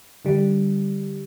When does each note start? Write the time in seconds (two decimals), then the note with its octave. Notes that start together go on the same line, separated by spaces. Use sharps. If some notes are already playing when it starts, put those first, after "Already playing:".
0.25 D3 G3